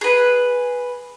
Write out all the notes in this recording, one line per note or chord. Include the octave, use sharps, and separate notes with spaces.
G#4 B4